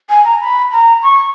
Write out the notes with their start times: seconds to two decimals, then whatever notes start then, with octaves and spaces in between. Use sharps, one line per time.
0.09 G#5
0.25 A#5
0.41 B5
0.72 A#5
1.03 C#6